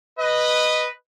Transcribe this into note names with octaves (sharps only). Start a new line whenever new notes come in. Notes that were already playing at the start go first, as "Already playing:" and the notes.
B4 D#5